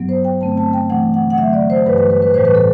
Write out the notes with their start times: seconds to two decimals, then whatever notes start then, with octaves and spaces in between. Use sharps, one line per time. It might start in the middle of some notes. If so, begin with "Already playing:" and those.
Already playing: G2 F#3 B3
0.09 C5
0.25 G5
0.41 G2 D3 A3 C4 A5
0.58 A5
0.73 G5
0.89 C3 E3 A3 D4 F#5
1.14 F#5
1.30 F#5
1.38 D3 F#3 A3 E5
1.53 D5
1.70 C5
1.86 G2 E3 G3 B4
1.98 B4
2.10 B4
2.22 B4
2.34 A2 E3 G3 C5
2.45 B4
2.55 A4